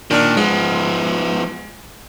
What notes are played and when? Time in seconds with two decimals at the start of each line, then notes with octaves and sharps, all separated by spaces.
0.11 A#2 D#3 D4 F6
0.37 F3 G#3 B3